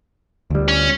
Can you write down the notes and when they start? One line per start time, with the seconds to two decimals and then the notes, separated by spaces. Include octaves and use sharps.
0.50 D2 G3
0.68 C#4